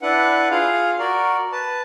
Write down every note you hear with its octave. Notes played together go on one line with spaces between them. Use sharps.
D4 E4 B4 F#5
F4 G#4 F5
F#4 A#4 D5
B4 A5